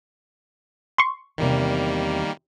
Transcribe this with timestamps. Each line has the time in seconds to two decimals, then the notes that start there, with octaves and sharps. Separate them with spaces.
0.98 C6 C#6
1.38 E2 A2 C3 D#3 G3 A#3